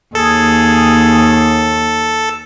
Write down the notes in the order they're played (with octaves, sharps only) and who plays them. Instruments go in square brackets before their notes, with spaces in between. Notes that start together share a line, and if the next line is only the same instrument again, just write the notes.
[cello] D#2 [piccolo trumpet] G#4 [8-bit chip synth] A4